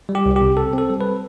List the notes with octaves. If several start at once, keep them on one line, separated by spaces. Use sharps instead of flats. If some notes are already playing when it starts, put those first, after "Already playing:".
G3
G4
C2
G4
C3
C4 A4
C4 A4
G3
B4